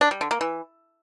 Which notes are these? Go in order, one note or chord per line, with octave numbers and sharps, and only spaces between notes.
D4
G3
D3
A#3
E3